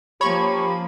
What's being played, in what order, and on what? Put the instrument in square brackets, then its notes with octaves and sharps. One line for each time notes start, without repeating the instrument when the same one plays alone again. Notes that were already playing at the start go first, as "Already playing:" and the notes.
[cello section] F3 A#3 C#4 [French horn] G4 [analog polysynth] C#5 C#6 [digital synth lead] B5